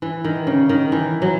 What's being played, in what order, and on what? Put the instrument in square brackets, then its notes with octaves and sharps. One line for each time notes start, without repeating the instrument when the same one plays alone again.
[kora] E3
D#3
C#3
D#3
E3
F#3